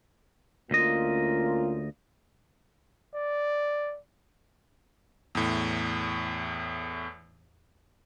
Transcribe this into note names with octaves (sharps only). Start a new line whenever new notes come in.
D2 A#3 C#4 F4 D#5
D5
E2 A2